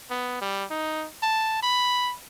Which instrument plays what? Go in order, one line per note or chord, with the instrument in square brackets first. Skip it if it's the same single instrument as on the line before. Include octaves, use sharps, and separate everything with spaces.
[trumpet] B3
G3
D#4
A5
B5